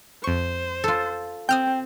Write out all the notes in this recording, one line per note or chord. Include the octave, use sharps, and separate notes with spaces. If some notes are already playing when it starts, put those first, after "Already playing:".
F2 C5 C#6
F4 A4
C4 G5 D#6 F6 G6